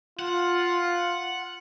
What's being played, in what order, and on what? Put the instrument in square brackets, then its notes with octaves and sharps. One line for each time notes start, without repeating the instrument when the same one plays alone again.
[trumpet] F4 [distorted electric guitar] F#5